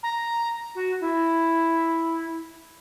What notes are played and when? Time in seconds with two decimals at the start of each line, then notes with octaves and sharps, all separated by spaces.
0.03 A#5
0.75 F#4
1.00 E4